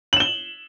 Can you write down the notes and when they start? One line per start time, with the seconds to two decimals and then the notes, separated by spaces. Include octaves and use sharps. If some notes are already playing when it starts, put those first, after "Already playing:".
0.13 F#7
0.17 E7
0.20 G7